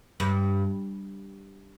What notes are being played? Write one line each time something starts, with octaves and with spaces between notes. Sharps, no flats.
G2